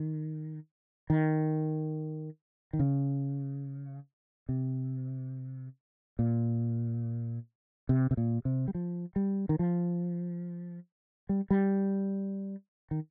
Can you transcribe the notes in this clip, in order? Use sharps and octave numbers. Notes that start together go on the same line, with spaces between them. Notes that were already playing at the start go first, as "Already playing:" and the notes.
Already playing: D#3
D#3
D#3
C#3
C3
A#2
C3
C3
A#2
C3
G3
F3
G3
D#3
F3
G3
G3
D#3